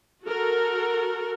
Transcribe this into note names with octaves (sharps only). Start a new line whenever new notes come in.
F#4 A4 A#4